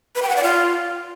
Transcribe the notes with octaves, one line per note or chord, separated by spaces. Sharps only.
B4
G5
F#5
D5
F4